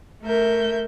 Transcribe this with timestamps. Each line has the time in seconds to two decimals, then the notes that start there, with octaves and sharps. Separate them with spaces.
0.23 A3 A#4 E5 G6